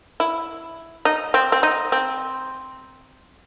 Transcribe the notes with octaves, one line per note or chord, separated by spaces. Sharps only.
E4
D#4
C4
C4
D#4
C4